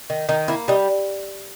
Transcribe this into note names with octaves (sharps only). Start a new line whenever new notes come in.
D#3
D#3 D#4
A#3 E4
G3 D#4